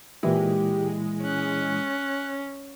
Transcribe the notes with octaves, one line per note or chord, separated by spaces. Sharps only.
A#2 E3 G#3 E4 G4
C#4 F#6